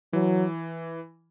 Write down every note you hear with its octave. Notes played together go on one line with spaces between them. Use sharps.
E3 F#3